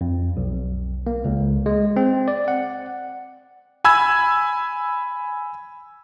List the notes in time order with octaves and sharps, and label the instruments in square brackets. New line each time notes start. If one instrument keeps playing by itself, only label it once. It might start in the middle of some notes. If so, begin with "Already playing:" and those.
[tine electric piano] F2
B1
A#3
C#2
G#3
C4
D5
F#5
[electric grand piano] G#5 B5 E6 G#6